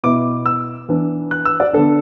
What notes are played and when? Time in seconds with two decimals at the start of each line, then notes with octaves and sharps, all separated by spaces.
0.03 B2 B3 E4 D6
0.46 E6
0.88 E3 B3 D4
1.31 F#6
1.45 E6
1.60 D5
1.73 D3 B3 D4 A4